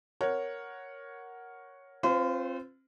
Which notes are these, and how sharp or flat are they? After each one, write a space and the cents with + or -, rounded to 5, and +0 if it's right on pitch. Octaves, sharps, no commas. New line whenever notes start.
A#4 +5 C#5 +0 F#5 +0
C4 +30 F4 +0 C5 -40